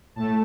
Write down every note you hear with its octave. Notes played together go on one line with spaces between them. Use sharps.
A2 A3 A5